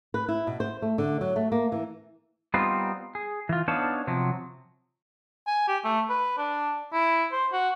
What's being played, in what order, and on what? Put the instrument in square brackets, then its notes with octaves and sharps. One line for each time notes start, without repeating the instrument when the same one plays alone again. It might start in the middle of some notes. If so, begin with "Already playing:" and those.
[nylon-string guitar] B4
E4
B2
C5
A3
D3
F#3
A3
A#3
E3
[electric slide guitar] G3 B3 C4 D#4 F4
G#4
E3 F4
B3 D4 D#4 C#5 F5 A5
C3 F3 F#3
[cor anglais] G#5
G4
A3
B4
D4
E4
C5
F#4